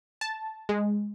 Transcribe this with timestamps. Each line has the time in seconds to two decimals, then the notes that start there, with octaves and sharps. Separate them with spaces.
0.21 A5
0.69 G#3